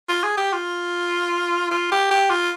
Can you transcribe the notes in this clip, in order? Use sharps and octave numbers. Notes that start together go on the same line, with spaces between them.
F4
G#4
G4
F4
F4
G4
G4
F4